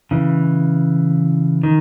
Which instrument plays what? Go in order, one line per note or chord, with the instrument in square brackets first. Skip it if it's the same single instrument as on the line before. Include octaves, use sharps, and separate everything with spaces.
[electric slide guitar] C#3 E3
D#3